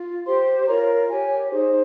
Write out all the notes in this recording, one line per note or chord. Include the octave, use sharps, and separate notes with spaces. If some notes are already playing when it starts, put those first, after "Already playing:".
Already playing: F4
G4 C5 C6
F4 A#4 C#5 A#5
G4 C#5 G#5
D#4 G#4 C5